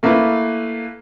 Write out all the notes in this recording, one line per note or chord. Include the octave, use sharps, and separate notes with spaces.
A3 A#3 E4 B4